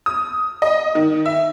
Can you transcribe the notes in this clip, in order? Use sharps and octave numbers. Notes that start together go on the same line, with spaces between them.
D#6
D#5
D#3
E5